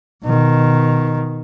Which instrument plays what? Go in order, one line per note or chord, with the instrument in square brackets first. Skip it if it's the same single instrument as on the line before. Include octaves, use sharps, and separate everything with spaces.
[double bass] B2 D#3